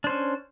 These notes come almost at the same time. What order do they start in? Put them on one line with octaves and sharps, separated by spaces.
D4 C5 C#4